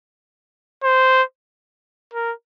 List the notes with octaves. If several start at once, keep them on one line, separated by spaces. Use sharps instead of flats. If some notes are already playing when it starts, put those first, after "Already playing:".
C5
A#4